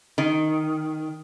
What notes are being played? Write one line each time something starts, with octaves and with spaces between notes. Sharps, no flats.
D#3